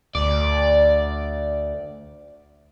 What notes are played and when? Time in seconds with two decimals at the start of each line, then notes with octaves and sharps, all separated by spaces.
0.15 D2 D5